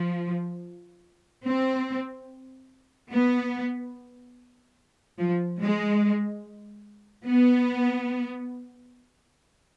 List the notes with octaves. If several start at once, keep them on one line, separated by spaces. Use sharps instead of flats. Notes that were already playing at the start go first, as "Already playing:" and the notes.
Already playing: F3
C4
B3
F3
G#3
B3